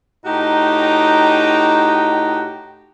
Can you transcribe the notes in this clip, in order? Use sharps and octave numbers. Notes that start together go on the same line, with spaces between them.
A2 D#4 F#4 G4 G5 A#5